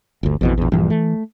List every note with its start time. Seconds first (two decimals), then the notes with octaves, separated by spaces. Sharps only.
0.23 G1 D2
0.41 A1 F2 B2 E3
0.58 A#1 E2
0.72 A#1 G2 E3
0.90 A3